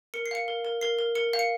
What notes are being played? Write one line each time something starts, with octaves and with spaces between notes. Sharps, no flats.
A#4 C#7
C7
F5 C#7
A#4
A#4
A#4 C7
A#4
A#4 C#7
F5
C#7